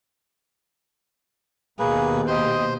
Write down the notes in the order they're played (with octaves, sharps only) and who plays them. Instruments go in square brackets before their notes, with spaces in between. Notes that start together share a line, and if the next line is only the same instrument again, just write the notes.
[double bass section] D#2 B2 [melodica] A#3 B4 [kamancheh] G#4
[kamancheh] G4 D#5 [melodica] C5